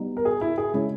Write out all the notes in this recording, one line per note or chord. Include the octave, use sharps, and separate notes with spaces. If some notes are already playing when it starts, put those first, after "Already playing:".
Already playing: G3 B3 D#4
A#4
G#4
E4
G#4
C#3 G#3 C#4 E4